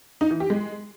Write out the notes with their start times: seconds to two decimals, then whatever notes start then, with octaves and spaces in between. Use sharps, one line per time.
0.21 D#4
0.31 E3
0.40 G4
0.50 G#3